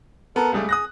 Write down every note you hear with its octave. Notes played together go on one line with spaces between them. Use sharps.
B3 A4 A#4
C#2 G3 A3 G#4
D#6 F#6 A#6